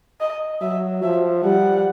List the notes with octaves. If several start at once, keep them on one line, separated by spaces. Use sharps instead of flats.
D#5
F#3 E5
F3 E5
G3 F#5